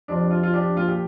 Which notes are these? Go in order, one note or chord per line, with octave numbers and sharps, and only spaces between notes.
F2 C3 F3 D4
F4
F4
D4 G4
A#2 F3 F4
G4